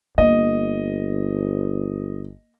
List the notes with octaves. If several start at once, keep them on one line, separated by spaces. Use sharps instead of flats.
G1 A#3 D#5